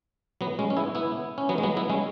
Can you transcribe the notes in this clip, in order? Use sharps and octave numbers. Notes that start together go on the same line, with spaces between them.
F#3 B3
G#3 C#4
C#4
B3 E4
B3 E4
C#4
F#3 B3
G#3
F#3 B3
B3 E4
G#3 C#4